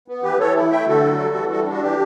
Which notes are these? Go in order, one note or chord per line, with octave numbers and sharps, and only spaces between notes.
B3
E3 G4 B4
E3 A4 C#5
E4
A3 E5 G5
D3 F#4 A4
F#3
G3
E3
G3 F#4 A4
D4
F#4
E3 G4